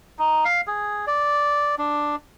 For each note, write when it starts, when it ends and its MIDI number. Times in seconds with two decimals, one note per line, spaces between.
0.19 0.44 63
0.45 0.61 77
0.67 1.05 68
1.07 1.75 74
1.78 2.16 62